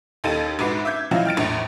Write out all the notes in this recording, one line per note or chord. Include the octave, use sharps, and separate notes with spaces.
D#2 D#4 A4 G5 A6 D#7
A#1 G#2 F#4 B4 D6 C7
E5 D6 G6 G#6
F3 F#3 E4 D#5 F5
G5 F6 A6 D7
A#1 E2 A2